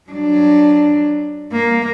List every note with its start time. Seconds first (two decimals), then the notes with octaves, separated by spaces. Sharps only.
0.10 F#3 D4
1.52 A#3